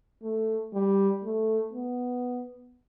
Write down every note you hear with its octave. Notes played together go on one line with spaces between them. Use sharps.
A3
G3
A3
B3